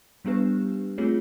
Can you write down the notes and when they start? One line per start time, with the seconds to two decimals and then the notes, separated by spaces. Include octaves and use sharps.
0.25 G3 B3 D4 G4 B4
0.98 A3 C4 F4 G#4 C#5